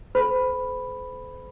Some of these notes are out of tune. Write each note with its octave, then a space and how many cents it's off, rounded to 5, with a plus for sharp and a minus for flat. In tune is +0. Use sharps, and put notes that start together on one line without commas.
A4 -45 C5 -35 B5 +0